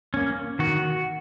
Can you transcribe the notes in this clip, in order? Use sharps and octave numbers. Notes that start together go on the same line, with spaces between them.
A#3 C#4
D#3 F#4